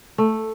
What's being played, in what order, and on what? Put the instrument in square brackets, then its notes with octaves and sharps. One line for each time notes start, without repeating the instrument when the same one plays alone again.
[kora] A3